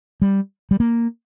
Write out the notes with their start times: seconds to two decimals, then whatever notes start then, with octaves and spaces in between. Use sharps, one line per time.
0.22 G3
0.71 G3
0.80 A#3